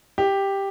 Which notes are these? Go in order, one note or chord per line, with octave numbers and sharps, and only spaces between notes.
G4